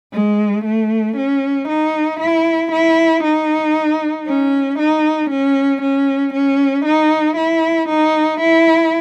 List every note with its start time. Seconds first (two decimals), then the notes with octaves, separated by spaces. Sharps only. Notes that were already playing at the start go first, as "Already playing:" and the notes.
0.13 G#3
0.65 A3
1.17 C#4
1.68 D#4
2.20 E4
2.72 E4
3.24 D#4
4.27 C#4
4.79 D#4
5.31 C#4
5.82 C#4
6.34 C#4
6.85 D#4
7.37 E4
7.89 D#4
8.41 E4